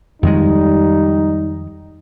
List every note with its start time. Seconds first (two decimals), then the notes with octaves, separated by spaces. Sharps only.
0.23 F2 D#3 G3 G#3 D#4